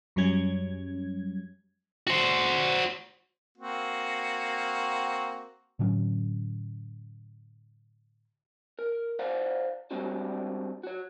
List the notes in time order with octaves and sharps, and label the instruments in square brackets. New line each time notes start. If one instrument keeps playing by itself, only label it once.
[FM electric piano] F#2 F#3 G3 C#4 G#6
[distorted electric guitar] F#4 C5
[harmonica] A#3 C4 F#4
[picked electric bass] A2 D3 F#3 C#4
[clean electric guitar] A#4
C5 D5 F5 F#5
G3 G#3 C4 D4 F#4 G4
F#4 C#5